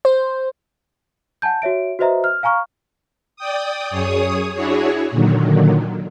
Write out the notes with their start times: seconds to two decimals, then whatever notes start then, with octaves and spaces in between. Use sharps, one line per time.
0.05 C5
1.42 F#5 G#5 A5 G6
1.62 F#4 C#5 E5 D7
1.99 F#4 B4 C5 D#5 E5 A#5
2.24 F6
2.43 F5 G#5 A#5 C#6 F6
3.36 D5 G5 D#6
3.90 F#2 G#4 C#5 D#6
4.54 D4 E4 F#4 G#4 C#5
5.11 A#2 D3 D#3 F#3